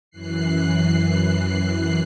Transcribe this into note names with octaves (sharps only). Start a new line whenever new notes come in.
F#2 E3 F#6 C7